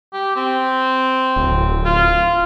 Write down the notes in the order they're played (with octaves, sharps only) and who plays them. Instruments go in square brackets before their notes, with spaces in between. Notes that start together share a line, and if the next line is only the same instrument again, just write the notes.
[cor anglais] G4
C4
[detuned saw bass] D1
[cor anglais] F4